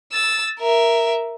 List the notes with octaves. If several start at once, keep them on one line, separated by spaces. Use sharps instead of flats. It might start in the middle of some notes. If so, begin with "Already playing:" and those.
E6 A6
A#4 E5